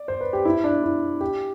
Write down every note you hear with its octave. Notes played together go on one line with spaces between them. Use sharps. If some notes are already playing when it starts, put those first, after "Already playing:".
Already playing: D5
C5
B4
G4
E4
D4
E4
G4